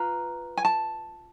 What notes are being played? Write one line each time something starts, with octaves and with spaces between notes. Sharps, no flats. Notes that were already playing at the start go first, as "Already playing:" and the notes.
Already playing: F4 B4 A#5
G#5
A5